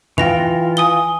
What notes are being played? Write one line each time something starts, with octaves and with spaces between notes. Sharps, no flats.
E3 F4 G5 A#6 F7
G#5 D#6 G7